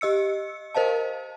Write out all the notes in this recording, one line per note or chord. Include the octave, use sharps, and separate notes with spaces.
G4 D#5 E6 C#7
A#4 C5 D#5 F5 A5